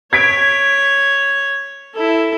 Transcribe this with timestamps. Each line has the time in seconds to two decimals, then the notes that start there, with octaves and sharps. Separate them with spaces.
0.13 C#5 G#6 B6 D7
1.94 E4 A4